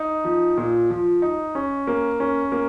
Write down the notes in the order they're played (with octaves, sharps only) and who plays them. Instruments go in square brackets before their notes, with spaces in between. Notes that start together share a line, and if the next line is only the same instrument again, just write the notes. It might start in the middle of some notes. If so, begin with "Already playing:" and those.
Already playing: [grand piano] D#4
F3
A#2
F3
D#4
C#4
A#3
C#4
A#3